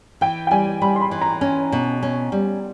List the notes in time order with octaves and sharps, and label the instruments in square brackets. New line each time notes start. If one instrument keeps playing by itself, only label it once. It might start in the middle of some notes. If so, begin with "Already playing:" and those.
[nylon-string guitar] E3 [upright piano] G5
[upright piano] G5
[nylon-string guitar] G3 [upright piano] G#5
[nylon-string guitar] G3 [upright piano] B5
[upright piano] C6
B5
[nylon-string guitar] E3
[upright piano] A#5
[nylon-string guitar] C#4
B2
C#4
G3